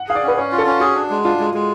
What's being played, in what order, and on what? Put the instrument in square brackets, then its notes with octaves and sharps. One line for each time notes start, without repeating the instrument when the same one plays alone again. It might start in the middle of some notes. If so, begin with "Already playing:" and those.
Already playing: [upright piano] F#5
[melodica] G#4 [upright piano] F5
[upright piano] D5
[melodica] C#4
[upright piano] B4
[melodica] C#4 [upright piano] C#5
[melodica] F4
[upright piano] A4
[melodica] C#4
[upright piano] F#4 [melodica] G#4
[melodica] D4
G#3
[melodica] D4 [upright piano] F4
[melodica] G#3
G#3